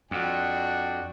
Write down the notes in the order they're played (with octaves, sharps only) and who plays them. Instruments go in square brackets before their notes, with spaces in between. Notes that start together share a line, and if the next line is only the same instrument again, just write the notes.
[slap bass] F2 [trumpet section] D4 F#4 G5